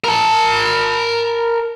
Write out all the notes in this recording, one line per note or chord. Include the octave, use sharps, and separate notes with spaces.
A#4 A5